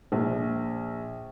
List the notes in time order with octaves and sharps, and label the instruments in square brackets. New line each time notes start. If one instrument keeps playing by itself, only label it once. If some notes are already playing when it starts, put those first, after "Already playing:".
[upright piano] A#1